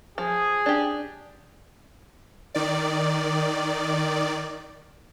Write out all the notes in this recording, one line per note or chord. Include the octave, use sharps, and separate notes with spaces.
F3 G#4
D4 G4
D#3 D5